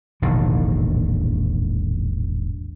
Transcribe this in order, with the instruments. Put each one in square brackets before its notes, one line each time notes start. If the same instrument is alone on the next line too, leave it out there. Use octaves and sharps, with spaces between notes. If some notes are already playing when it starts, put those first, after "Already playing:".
[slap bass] E1 A#1 A2 D#3